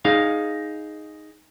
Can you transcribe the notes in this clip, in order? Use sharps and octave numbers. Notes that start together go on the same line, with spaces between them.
D#4 G#4 F5